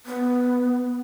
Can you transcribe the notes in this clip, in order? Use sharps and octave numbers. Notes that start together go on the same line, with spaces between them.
B3